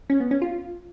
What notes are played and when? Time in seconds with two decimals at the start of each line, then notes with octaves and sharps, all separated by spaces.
0.10 C#4
0.20 B3
0.31 C#4
0.42 F4